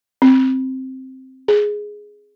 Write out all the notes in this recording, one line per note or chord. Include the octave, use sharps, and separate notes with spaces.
C4
G#4